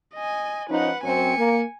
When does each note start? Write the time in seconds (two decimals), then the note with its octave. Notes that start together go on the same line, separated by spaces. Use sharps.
0.15 D#5 G#5
0.70 F3 C#4 D#4 B4 F#5
1.04 F#2 F#3 C4 G#5 C#7
1.37 A#3